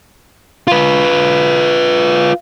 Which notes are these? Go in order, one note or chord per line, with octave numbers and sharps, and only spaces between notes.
F4 B4